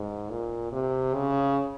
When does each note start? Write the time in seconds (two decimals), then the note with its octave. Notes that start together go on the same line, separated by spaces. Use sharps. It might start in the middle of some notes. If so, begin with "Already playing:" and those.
Already playing: G#2
0.30 A#2
0.73 C3
1.15 C#3